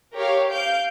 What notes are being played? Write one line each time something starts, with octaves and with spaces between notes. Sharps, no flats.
G4 A#4 C#5 F5
F5 G6 D7